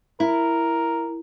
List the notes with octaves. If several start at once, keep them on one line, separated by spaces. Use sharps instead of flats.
E4 A#4